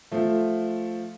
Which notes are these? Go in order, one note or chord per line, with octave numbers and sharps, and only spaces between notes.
F3 A3